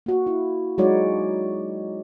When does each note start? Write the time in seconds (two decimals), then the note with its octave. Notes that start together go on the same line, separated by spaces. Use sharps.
0.06 A#3 F#4
0.27 E4
0.78 F#3 G#3 D#4 F#4 C#5 D5